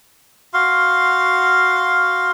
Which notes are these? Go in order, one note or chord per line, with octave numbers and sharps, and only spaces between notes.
F#4 F5 C6